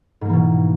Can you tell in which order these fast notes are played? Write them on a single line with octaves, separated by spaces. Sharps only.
G#2 A#3 E3 B2